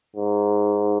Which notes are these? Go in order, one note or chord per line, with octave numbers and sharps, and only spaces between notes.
G#2